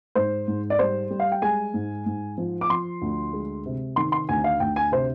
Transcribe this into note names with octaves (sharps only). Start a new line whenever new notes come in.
G#2 C5
G#2
D5
G3 C5
G3
F5
G5
G#3 G#5
G#2
G#2
F3
D6
F3 C6
D2
G#3
C3
D#3 C6
C6
D2 G#5
F5
D2 G5
G#5
C3 C5